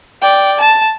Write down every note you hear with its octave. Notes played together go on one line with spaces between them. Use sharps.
D5 G5
A5